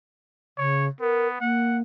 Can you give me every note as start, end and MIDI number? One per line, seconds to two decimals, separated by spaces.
0.58 0.88 49
0.58 0.86 73
1.01 1.40 59
1.01 1.28 70
1.41 1.82 58
1.41 1.78 78